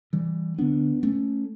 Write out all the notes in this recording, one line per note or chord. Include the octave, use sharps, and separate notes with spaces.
E3 G3
D2 D3 B3 D4
A3 C#4